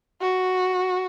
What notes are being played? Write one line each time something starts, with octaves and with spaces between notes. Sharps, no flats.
F#4